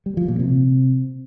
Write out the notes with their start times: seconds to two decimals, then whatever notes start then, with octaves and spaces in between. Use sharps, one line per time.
0.06 G3
0.17 F3
0.28 A#2
0.39 C3